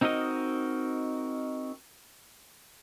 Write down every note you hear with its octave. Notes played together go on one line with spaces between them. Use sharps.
C4 D#4 F#4 A#4 D#5